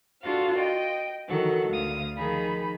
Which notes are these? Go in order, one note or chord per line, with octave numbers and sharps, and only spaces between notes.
D4 F4 F#4 A4 F5
D#5 G5
D#3 E3 F#3 A4 F#5
D2 D3 F5 D#6
D#3 F3 D#4 G#4 B5